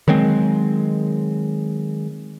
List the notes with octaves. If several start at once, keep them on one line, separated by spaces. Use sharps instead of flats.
D#3 F#3 G#3 C4